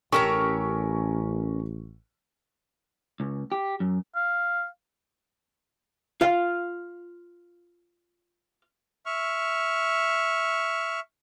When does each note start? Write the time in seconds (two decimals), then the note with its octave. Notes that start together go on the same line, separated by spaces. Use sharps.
0.12 A1 C#4 G4 A4 A#4 A#5 C#6
3.20 C#2
3.52 G4
3.80 F#2
4.16 F5
6.21 F4 F5
9.06 E5 C#6 F6